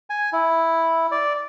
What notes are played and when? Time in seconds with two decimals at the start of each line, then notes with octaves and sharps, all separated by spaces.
0.10 G#5
0.33 E4
1.12 D5